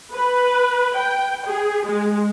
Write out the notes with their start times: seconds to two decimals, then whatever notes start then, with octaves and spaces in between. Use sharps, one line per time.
0.12 B4
0.95 G5
1.46 G#4
1.86 G#3